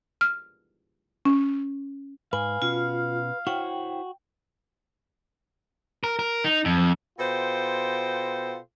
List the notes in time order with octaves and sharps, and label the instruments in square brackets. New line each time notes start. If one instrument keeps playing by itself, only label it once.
[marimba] F6
C#4
[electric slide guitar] G#2 [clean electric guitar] B4 [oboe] F5 [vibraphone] G#5
[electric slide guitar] B2 C#4 [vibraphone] F4
[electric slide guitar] E4 C5 C#5 [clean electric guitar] F#4 [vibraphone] G5
[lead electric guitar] A#4
A#4
D#4
F2
[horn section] B2 F4 A4 C5 G5